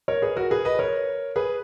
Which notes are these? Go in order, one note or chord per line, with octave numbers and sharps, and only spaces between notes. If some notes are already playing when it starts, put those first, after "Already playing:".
A#4 C#5
G#4 B4
F#4 A#4
G#4 B4
B4 D#5
A#4 C#5
G#4 B4